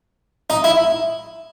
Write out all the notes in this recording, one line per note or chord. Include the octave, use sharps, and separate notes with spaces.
D#4
E4